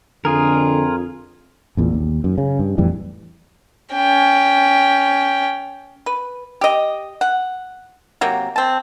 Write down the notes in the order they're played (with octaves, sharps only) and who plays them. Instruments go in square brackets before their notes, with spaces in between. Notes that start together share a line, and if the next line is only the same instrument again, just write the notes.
[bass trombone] F2 [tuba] D3 [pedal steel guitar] F4 G#4 A#4
[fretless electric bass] A1 E2 A#2
D#2
F#2
C#3
G2
F2 A2 E3 G3
[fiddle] C#4 G5
[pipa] B4
G4 D#5
F#5
C3 F#3 A#3
C4 A5